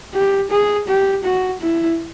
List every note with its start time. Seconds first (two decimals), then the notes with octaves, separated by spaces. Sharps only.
0.14 G4
0.51 G#4
0.88 G4
1.24 F#4
1.61 E4